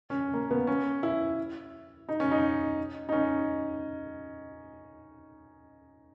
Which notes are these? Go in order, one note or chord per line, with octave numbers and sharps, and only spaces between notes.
C#4
A#3
B3
C#4
E4
D#4
C#4
D#4
D#4
C#4